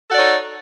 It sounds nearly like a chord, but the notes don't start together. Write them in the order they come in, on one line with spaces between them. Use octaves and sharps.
A4 F#4 D5 C#5 D#4